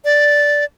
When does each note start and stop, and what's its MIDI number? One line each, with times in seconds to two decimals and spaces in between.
0.05 0.65 74